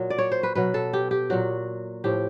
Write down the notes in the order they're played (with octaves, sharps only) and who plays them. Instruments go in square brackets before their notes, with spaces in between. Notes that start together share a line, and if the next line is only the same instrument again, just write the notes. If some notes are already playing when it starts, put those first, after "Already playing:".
Already playing: [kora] A#2 F#3
D5
C#5
C5
B4
B2 F#3 B4
A4
G4
G4
A#2 F#3 F#4
A2 F3 G4